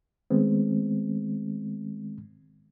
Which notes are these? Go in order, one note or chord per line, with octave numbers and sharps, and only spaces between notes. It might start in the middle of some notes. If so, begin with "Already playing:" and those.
D#3 G#3 A3 B3 C4